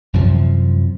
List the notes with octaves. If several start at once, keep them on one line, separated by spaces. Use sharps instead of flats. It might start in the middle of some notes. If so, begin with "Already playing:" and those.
F#2 C3 E3 F3